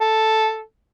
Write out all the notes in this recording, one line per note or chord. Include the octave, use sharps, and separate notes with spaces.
A4